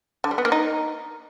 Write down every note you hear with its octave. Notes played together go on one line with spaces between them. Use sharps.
D3
G3
B3
A#3
D#4